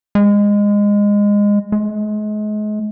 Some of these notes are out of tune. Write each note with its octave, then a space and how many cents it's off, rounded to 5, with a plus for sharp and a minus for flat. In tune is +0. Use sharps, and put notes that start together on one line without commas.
G#3 -20
G#3 +35